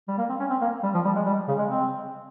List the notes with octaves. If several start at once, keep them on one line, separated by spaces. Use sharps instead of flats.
G3
A#3
C4
C#4
C4
A#3
G3
F3
G3
G#3
G3
C#3
G#3
C4